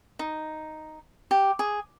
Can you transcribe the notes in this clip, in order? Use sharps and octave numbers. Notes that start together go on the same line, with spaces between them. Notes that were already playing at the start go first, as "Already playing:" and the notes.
D#4
G4
G#4